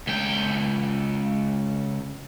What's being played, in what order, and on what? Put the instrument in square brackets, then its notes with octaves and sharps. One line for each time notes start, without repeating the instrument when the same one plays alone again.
[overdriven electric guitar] C#2 G5